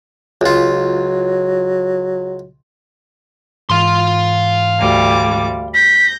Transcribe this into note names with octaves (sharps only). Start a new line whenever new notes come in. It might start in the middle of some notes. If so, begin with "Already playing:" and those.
C#2 F#3 F4
G#2 E3 F5 C6
D2 G3 D6
G6 A#6 B6